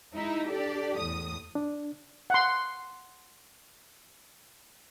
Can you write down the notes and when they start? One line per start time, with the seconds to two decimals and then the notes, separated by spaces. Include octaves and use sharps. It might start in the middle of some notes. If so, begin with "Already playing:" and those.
0.13 G#3 D#4 E4
0.48 D4 G4 A4 D5
0.98 E2 A2 D#6
1.55 D4
2.30 F#5 C6